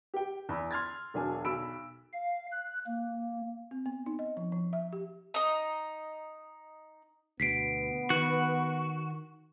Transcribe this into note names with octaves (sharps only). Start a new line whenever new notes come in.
G4 G5
E2 B5 E6
C6 F6 G#6 A6
E1 F#3 D4 G#5
B1 B5 E6 D7
F5
F#6
A#3
C4
B3
D#4
D#5
F3
F3
E5
G4
D#4 D#5
D2 B2 B3 B6 C7 D7
D#3 F#4